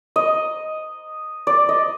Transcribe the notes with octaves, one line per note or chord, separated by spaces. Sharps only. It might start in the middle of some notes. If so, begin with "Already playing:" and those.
D#5
D5
D#5